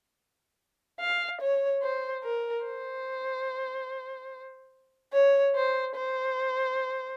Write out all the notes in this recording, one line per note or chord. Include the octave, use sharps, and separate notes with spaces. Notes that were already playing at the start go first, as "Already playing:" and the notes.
F5
C#5
C5
A#4
C5
C#5
C5
C5